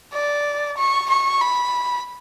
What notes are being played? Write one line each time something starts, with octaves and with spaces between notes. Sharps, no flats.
D5
C#6
C#6
B5